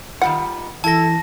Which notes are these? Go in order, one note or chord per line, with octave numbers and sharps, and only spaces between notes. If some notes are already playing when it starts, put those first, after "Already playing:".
D#3 G3 F4 F#5
E3 E4 A4 A5 A#6